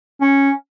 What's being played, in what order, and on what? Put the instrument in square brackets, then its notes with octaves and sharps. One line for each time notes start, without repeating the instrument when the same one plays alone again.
[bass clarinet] C#4